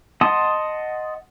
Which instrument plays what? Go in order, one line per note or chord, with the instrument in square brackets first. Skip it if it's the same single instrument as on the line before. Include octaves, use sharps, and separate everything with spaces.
[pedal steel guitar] D#5 F#5 A5 C6 D#6